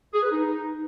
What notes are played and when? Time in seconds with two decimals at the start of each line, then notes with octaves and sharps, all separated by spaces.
0.14 G#4
0.23 B4
0.32 D#4